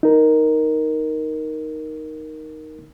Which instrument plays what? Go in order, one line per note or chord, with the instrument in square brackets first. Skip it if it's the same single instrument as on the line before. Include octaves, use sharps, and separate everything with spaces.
[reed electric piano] D#4 A#4